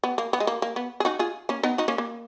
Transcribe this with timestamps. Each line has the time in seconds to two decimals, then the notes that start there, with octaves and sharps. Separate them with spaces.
0.04 B3
0.18 A#3
0.33 B3
0.40 G#3
0.47 A#3
0.62 A#3
0.76 B3
1.00 G#4
1.05 D#4 F#4
1.19 F4 G#4
1.49 A#3 C#4
1.63 B3 D#4
1.78 D#4 F#4
1.88 A#3 C#4
1.98 A#3